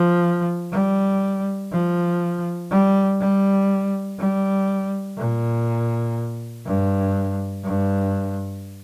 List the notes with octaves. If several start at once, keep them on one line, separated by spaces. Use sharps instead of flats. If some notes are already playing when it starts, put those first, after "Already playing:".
Already playing: F3
G3
F3
G3
G3
G3
A#2
G2
G2